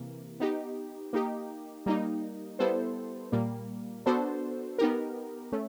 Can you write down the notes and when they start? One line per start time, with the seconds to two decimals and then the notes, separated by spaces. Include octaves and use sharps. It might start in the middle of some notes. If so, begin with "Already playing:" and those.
Already playing: C3 E3 A#3
0.40 B3 D#4 G4
1.13 A#3 D#4 G4
1.86 G3 A#3 D#4
2.59 G3 B3 E4 A4 C5
3.32 A#2 G3 A#3
4.06 B3 D4 F#4 A4 C5
4.78 B3 D#4 G4 A#4
5.52 A3 C#4